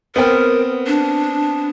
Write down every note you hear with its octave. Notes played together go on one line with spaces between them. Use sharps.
B3 C4 A#4 G5
D4